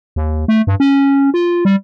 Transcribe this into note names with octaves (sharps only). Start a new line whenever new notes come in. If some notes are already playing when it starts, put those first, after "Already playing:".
D#2
A3
G2
C#4
F4
G3